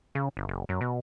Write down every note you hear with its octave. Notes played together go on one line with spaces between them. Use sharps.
C#3
G1
F#1
F#2
B2